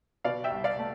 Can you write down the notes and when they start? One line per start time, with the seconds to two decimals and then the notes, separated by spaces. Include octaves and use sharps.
0.24 B2 D5 F5
0.44 E5 G5
0.51 C2
0.64 D5 F5
0.79 A3